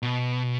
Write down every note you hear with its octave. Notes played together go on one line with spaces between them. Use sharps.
B2